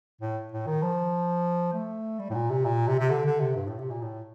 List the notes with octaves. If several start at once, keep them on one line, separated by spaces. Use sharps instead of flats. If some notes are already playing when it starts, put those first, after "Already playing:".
A2
A2
D#3
F3
A3
G3
A2
A#2
C3
A#2
C3
C3
D3
D3
C3
G2
A2
C3
A#2
A2